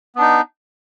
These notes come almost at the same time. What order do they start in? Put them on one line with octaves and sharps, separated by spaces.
B3 D4 D#4